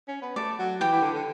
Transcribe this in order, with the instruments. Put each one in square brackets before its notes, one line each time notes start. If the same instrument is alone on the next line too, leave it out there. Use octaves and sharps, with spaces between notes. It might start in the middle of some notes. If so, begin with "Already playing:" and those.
[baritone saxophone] C#4
B3
[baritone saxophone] A3 [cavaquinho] D5
[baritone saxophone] F#3
[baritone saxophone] E3 [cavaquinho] G4 G5
[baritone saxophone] E3
D3
D3